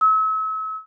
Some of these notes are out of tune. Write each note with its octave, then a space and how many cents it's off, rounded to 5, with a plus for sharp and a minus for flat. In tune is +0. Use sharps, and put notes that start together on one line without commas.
E6 -40